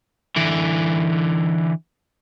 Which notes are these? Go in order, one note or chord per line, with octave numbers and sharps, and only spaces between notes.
D3 E3